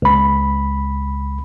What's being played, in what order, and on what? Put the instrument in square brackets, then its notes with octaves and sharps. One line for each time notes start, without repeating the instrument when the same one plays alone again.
[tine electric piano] C#2 B5